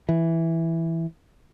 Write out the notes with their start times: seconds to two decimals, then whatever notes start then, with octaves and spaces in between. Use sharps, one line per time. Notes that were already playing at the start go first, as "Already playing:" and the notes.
0.09 E3